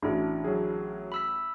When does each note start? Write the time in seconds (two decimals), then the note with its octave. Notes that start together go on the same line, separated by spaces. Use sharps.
0.03 A1 D4 E4 F#4
0.44 F#3 G#4
1.12 B5 E6 B6